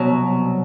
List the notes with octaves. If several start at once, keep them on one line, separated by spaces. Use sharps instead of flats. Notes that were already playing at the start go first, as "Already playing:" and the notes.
Already playing: C2 B2 F#3